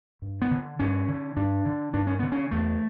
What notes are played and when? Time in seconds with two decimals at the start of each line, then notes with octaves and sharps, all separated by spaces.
0.22 G2
0.42 B3
0.51 D3
0.79 G2 C#4
1.08 D3
1.37 G2 D4
1.65 D3
1.94 G2 D4
2.07 C#4
2.19 D3 B3
2.32 C#4
2.51 E2 A3